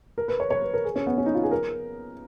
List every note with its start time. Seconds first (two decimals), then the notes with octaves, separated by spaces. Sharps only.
0.18 A#4
0.28 B4
0.40 C#5
0.51 C#5
0.62 B4
0.74 A#4
0.85 G#4
0.96 C#4
1.07 B3
1.18 C#4
1.26 D#4
1.35 F4
1.43 G#4
1.51 A#4